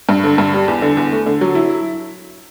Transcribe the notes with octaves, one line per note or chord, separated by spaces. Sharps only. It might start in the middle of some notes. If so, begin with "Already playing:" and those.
G2
D3
G2
G3
E2
D3
E2
A3
D3
F#3
E4